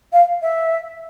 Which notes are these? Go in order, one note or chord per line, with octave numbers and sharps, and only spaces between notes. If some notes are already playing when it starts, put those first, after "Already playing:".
F5
E5